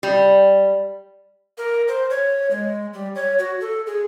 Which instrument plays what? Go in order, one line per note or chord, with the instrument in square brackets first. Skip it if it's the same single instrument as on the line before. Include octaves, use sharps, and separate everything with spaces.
[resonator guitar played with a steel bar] G3
[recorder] A#4
C5
C#5
G#3
G3
C#5
F#4
A4
G#4